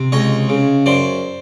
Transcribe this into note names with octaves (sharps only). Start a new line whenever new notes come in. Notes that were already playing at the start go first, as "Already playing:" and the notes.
Already playing: C3
C#2 C#5 D#5
C#3
F#2 C5 D5